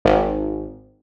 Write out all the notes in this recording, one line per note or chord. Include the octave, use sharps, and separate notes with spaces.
G#1